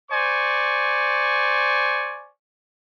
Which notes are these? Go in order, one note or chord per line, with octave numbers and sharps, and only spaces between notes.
C5 D5 G#5 C#6